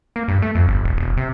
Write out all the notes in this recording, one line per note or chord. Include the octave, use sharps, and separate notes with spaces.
A#3
G2
A3
F2
G1
E1
E1
C3